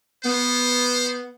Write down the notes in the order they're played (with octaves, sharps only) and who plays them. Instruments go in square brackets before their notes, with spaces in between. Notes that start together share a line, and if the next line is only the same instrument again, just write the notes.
[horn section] B3 [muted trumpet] C5